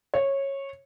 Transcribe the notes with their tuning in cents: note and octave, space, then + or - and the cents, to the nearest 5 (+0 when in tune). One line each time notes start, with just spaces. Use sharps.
C#5 -15